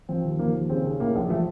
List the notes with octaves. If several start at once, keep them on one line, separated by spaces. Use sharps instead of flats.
F3 C4
D#2
F3 A#3
D#2
C#3 C4
C#3
A2 A#3
A#1
F3 A3